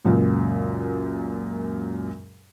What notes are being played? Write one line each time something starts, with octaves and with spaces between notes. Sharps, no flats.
C#2 F#2 A#2